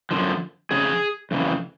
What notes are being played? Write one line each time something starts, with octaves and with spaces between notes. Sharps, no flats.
F#2 D3 F3
F2 C#3 G#4
F2 C#3 E3